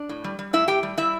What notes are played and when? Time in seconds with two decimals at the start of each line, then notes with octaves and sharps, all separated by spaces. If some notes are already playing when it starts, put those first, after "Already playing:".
Already playing: D4 D5
0.09 A2
0.24 G3
0.39 G3
0.53 A2 E4 E5
0.68 A2 G4 G5
0.83 G3
0.97 G3 E4 E5